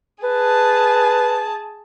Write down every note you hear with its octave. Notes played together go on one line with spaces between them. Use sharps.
G#4 B4 A5